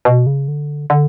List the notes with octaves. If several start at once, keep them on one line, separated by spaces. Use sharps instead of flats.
B2
C#3
D3
D3